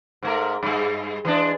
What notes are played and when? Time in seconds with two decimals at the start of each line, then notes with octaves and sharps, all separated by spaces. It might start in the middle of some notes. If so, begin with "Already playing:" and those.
0.23 G#2 A3 A#4
0.63 G2 G#3
1.25 E3 G#3 D4